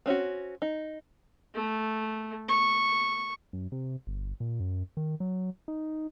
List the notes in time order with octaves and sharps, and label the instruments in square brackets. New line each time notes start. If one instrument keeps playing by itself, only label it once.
[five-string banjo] C4 C#4 F4 F#4
D#4
[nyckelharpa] A3
C#6
[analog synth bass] F#2
C3
G1
A#2
F#2
D#3
F#3
D#4